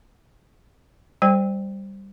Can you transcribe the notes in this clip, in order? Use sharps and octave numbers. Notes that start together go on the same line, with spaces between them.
G3 C5 G5